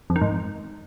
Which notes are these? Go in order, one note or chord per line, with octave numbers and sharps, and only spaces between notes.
F2
D#3
G#2